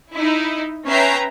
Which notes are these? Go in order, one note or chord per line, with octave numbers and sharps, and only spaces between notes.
D#4 E4
C#4 B4 E5 G5 A#5 C7